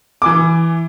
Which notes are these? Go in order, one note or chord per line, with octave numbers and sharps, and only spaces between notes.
E3 G#5 D6